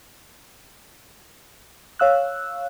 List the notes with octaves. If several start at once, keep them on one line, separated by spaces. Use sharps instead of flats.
C#5 F5 E6 F#6